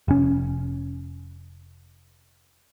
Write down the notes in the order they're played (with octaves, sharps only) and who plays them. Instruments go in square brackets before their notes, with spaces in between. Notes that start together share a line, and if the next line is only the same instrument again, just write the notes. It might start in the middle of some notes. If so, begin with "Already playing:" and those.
[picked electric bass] F1 C#4